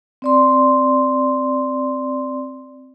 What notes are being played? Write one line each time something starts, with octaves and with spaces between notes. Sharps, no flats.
C4 D5 C6